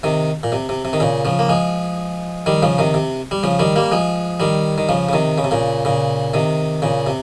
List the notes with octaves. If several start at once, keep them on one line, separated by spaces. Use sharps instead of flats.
C3 D#3
A#2
C3
C3
C3
D#3
A#2 C#3
C#3 F3
A#3
F3 G#3
D#3 G3
C#3 F3
C3 D#3
C3
G3
C#3 F3
D#3 G3
G3 A#3
F3 G#3
D#3 G3
D#3
C#3 F3
C#3
C3 D#3
C#3
C3
A#2 C#3
A#2 C#3
C3 D#3
A#2 C#3
C3